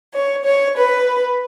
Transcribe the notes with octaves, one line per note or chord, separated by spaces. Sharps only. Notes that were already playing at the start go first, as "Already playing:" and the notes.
C#5
C#5
B4